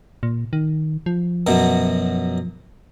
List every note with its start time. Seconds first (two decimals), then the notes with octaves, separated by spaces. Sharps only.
0.23 A#2
0.53 D#3
1.06 F3
1.47 F#2 B2 F#3